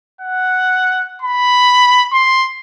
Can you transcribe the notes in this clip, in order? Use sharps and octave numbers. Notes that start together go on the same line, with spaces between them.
F#5
B5
C6